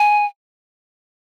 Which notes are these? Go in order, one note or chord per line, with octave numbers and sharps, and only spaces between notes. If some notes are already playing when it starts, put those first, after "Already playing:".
Already playing: G#5